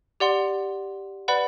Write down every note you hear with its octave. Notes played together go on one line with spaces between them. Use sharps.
G4 D5 F#5 C6
B4 D5 F#5 B5